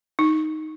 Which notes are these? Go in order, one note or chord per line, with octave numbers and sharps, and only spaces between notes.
D#4